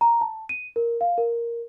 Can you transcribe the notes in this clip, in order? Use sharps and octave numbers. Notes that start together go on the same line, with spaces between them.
A#5
A5
D#7
A#4
F5
A#4